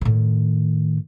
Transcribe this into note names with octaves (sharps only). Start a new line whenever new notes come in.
A2 D#3